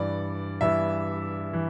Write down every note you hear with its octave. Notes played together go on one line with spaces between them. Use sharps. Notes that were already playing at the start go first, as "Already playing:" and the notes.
Already playing: G2 E3 D5
G2 E3 E5
E3